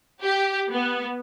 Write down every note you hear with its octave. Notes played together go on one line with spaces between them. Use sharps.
G4
B3